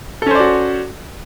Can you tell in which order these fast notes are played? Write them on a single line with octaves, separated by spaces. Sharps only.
A4 C#4 C5 D5 F#4